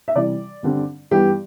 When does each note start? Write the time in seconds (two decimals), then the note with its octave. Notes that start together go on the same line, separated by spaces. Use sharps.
0.08 E5
0.15 C3 E3 G3 D5
0.63 G2 D3 G3 C4
1.11 G2 E3 B3 G4